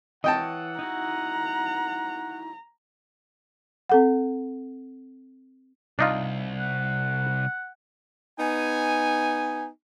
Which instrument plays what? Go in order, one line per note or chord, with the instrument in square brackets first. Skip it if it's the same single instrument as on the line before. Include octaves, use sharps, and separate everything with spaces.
[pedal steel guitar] E3 C#5 [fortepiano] D#5 G5 A5 [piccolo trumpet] F#5
[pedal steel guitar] D#4 E4 F#4 [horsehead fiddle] A#5
[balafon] C4 A4 F#5
[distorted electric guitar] C2 [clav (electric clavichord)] D4 D#4 F4
[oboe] F#5
[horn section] B3 D#4 G#5